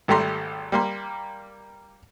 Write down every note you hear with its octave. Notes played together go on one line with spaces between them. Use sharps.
G#1 G3 A3 G4 A#5 C6
G3 A#3 C6